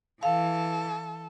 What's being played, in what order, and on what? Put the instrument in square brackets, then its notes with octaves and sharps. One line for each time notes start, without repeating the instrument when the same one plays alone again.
[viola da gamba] E3 [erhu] A4 [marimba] F5